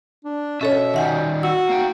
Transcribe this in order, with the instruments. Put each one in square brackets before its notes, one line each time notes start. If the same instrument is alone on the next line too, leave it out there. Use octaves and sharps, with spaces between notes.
[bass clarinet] D4
[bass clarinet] B2 [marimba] C#4 A4 C#5 [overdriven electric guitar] E5
[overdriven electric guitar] D#3 G3 [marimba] E5 F#5 G#5
[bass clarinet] F#4 [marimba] E6
[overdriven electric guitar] A#3 G5